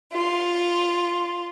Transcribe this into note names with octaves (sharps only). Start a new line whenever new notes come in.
F4